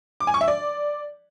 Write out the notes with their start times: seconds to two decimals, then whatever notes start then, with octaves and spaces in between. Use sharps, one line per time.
0.20 D6
0.27 G#5
0.34 C#6
0.41 E5
0.48 D5